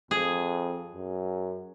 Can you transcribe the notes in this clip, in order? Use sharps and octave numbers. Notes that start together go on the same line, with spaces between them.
F2 G#4
F#2